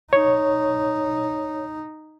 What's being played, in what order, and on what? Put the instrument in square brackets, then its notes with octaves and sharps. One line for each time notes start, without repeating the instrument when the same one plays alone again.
[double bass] D#4 [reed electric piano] C#5